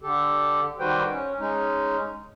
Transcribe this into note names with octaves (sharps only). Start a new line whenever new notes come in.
D3 G4 A4
D#3 G3 F#4 B4 C5 G5
C#4
G#3 C#4 D#4